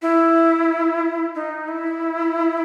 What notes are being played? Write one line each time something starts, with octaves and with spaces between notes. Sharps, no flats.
E4
D#4
E4